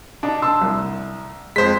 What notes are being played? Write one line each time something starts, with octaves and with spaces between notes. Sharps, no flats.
D4 D#4
A5 C6 E6
C2
F2 G#3 C5 B6